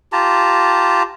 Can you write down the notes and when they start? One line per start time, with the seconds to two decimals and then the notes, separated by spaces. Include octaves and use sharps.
0.13 F4 G4 A5 A#5